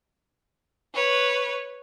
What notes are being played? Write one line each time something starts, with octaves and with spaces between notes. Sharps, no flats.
B4 C#5